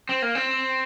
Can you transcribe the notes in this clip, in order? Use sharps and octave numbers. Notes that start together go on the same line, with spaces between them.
C4
A#3
C4